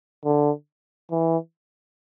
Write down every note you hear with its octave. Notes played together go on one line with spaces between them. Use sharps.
D3
E3